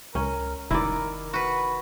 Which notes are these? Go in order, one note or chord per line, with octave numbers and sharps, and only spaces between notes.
C#2 C#4 A#4
F1 D#3 E4 A#4 D5
F#4 B4 B5